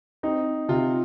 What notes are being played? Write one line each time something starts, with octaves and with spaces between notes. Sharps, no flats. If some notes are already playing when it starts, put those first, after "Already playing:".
C4 D#4
C3 F4